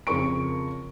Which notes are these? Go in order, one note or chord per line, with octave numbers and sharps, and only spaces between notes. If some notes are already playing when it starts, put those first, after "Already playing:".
F2 C#3 A#4 C#6 D7